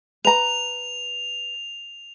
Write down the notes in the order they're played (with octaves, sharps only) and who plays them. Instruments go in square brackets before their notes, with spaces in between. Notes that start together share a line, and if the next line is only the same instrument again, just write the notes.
[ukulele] B4 A#5 [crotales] F7